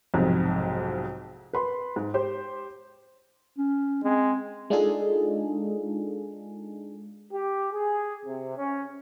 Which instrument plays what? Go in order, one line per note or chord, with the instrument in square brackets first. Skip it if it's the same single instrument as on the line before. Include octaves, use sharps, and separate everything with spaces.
[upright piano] B1 F2 G#2 C3
B4 B5 C6
G#2
G4 C5
[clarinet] C#4
[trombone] G#3 [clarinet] C4
[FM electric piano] G#3 D4 D#4 F4 G#4 A4
[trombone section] G4
G#4
C3
C#4